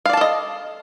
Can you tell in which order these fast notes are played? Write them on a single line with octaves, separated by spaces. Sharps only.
F5 D5 A5 A4 D#5